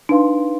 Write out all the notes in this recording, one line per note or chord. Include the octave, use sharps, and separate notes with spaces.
D4 D#4 B4 F5 C6